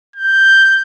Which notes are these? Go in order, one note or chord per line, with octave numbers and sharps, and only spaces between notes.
G6